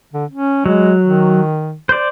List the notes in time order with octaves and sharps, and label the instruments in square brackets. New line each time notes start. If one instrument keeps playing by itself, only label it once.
[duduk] D3
C#4
[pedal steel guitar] F#3 [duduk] G#3
[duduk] D#3
[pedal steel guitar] C5 D5